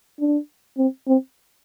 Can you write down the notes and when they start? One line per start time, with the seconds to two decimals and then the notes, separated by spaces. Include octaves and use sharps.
0.20 D4
0.78 C4
1.07 C4